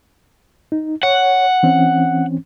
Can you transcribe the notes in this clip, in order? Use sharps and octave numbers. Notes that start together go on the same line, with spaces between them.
D#4
C#5 F#5
E3 C4 C#4